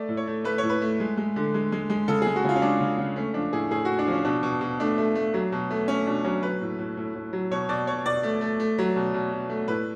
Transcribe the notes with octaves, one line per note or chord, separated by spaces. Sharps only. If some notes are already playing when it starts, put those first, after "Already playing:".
Already playing: A3 D5
A2
C#5
A3
A3 B4
C#5
A2
B4
A3
G#3
G#3
D3
G#3
G#3
G#3
C#3 A4
G#3 G#4
F#4
C#3 F4
C#4
G#3 D4
C#3
C#3
A3 C#4
F3 D4
A2 G#4
A2 G#4
A2 F#4
D4
F3 C#4
B2 D4
B2
B2
A3 D4
A3
A3
F#3
B2
A3
A3 C#4
B2 D4
F#3 C#4
F#3 B4
A2
A2
A2
A2
F#3
B2 C#5
B2 D5
B2 C#5
B2 D5
A3
A3
A3
F#3
B2
B2
B2
A3
A2 B4